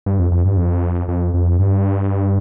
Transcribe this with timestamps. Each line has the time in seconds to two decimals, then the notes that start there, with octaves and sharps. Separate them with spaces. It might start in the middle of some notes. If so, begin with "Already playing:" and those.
0.06 G2
0.19 F2
0.31 F2
0.45 G2
0.57 F2
1.08 F2
1.34 F2
1.59 G2